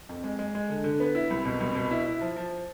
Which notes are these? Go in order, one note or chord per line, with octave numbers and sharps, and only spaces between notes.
F2
G#3
G#3
G#3
D3
D3
B3
E4
C2
B2
C2
B2
E4
E4
F3
F3